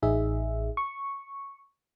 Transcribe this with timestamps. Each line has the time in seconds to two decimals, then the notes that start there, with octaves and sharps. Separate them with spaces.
0.02 A1 D#4 G#4 E5
0.77 C#6